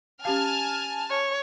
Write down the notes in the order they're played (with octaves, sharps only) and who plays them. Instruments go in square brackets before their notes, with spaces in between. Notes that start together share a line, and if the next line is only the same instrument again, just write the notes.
[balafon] C#4 G4 F5 [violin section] G#5 A5 F6
[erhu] C#5